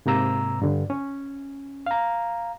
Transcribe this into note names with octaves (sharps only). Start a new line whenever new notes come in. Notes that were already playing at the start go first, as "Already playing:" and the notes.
G#2 C3 A#3 A#5 E6
G2 D3
C#4
F5 A#5